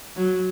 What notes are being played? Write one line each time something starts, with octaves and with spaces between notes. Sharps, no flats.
F#3